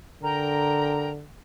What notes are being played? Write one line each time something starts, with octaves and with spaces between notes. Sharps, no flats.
D3 A#4 G5 A#5